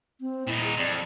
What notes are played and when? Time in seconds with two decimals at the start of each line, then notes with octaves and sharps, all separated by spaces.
0.21 C4
0.47 A#2 D#4 E4
0.63 G#4
0.77 F2 D5